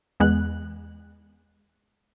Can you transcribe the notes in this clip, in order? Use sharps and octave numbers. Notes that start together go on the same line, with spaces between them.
E2 G#3 B3 F#6